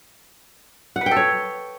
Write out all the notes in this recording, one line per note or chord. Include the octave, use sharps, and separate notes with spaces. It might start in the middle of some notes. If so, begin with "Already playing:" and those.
F#5
B4
G5
A4
C#5